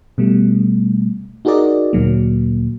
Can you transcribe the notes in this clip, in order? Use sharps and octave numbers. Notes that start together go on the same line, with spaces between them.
B2 G3 A3
D#4 F#4 G#4 A#4 D5 D#5
D2 A#2 F#3 A#3